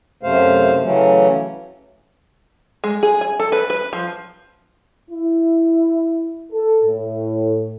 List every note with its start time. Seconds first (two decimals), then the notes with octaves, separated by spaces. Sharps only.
0.23 F#2 C3 A3 C5 F5
0.83 C#3 E3 F#3 A3 C#4
2.84 G#3
3.03 G#4
3.21 G#5
3.40 A4
3.52 B4
3.70 B4
3.93 F3
5.10 E4
6.53 A4
6.84 A2